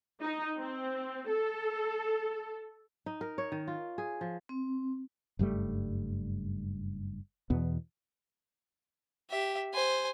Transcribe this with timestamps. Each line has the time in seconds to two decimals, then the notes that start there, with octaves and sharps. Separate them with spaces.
0.22 D#4
0.59 C4
1.28 A4
3.06 D#4
3.21 A#4
3.38 C#5
3.52 D#3
3.67 F4
3.98 G#4
4.21 F3
4.49 C4
5.39 F#1 G2 G3 A3
7.50 E2 B2 E3 B3
9.31 G4 E5
9.74 C5 G#5